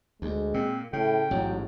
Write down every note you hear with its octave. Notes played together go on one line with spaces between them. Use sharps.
D2 G#3
A#2 C4
A2 C#3 G5
A1 G#2 F#3